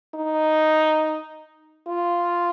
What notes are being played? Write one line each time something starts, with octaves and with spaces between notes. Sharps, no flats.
D#4
F4